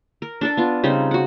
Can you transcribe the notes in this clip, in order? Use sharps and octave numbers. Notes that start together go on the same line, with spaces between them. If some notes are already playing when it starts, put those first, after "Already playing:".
A#4
D4 A4 D5
B3 F4
C#3 G3 C4 D#4
F#4 F#5